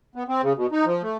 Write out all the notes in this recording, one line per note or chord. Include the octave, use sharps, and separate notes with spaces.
B3
C4
C#3
B2
D#4
F3
A3